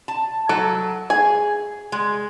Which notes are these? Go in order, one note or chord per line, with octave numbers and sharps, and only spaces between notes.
A5
F#3 A4
G#4 G#5
G#3